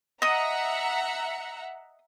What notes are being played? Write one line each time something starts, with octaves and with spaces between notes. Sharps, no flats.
D#5 E5 F#5 A#5 D#6